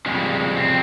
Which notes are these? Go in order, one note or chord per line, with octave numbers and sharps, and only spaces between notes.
F2 C#3 G3 G#3
C4